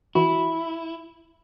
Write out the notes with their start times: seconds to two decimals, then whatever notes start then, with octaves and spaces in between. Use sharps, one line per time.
0.15 E3 E4 F#4